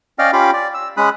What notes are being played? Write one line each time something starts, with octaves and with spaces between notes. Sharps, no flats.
C#4 D5 D#5 F5 G5 F6
C#4 F4 G4 F5 G5 B5
D5
E6
G#3 C#4 G#4 B5 D#6 F#6